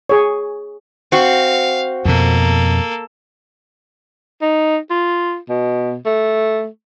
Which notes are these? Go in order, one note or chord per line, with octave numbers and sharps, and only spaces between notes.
G#4 C#5
C4 F#4 F5
F2 B2 A#3 A4
D#4
F4
B2
A3